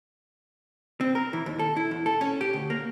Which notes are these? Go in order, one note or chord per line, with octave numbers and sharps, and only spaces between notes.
C4
A#4
E3
D#2
A4
E4
E2
A4
C#4
G4
D2
A#3